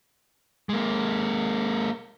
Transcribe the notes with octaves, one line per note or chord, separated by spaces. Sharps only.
G#3 A#3